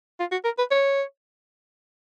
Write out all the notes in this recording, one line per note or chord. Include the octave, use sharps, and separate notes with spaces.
F4
F#4
A#4
B4
C#5